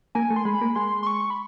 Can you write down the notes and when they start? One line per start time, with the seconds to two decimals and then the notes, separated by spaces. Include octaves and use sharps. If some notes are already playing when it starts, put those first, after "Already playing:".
0.15 A#3 G#5
0.30 A3
0.36 C6
0.45 G#3 B5
0.61 A#3
0.75 G#3 C6
1.03 C6
1.07 C#6
1.30 B5